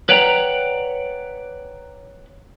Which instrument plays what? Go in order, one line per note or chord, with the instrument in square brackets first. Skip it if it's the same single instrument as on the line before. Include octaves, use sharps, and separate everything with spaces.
[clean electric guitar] B4 C#5 D5 F#5 G5 A#5